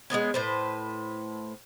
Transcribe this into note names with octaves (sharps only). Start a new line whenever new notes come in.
G#3 A#3 B3 C#4
A2 B4 C5